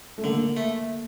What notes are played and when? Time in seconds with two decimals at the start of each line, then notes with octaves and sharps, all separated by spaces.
0.18 A3
0.24 D3 A#3
0.57 A3